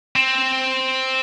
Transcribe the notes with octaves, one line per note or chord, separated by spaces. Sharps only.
C4